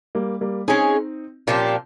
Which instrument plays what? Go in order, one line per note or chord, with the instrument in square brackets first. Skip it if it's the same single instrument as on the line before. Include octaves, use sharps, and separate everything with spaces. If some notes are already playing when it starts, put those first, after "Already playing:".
[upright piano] G3 A#3
G3 A#3
[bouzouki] G#3 C#4 G#4 C#5 [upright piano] C4 D#4
[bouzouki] A#2 F3 C4 G4 [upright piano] C#4 F4